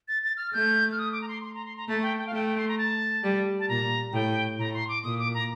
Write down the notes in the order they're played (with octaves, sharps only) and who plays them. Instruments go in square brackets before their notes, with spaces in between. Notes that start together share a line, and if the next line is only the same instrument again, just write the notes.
[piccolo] A6
A6
F6
[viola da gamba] A3 [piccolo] G6
[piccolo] F6
D#6
D6
A#5
C6
C6
A#5
C6
A#5
[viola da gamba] A3 [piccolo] A5
[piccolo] G5
G5
F5
[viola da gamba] A3 [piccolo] G5
[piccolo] C6
A#5
A5
[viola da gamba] G3
[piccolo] A5
[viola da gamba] A#2 [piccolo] A#5
[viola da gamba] A2 [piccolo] G5
[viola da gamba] A2 [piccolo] A#5
[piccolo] C6
D6
[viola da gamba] A#2 [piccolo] D#6
[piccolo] D6
A#5